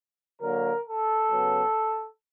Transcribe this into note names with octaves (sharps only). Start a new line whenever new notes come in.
D3 F#3 A#3 A#4
A4
C#3 F#3 B3